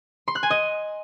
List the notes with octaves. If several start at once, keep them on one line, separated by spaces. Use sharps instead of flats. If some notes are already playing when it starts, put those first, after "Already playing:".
C6
F#6
G#5
D#5